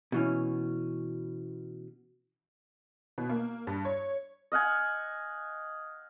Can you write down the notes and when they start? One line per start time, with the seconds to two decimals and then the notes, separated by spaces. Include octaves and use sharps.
0.12 B2 E3 C#4
3.18 B2
3.30 A#3
3.67 G2
3.85 C#5
4.52 D#5 F5 F#5 G#5